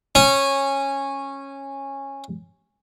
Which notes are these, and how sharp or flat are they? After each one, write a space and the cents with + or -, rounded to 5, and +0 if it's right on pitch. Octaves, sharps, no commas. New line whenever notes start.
C#4 -15